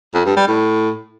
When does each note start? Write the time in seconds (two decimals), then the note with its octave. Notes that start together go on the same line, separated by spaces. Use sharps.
0.14 F2
0.25 G2
0.37 G3
0.48 A2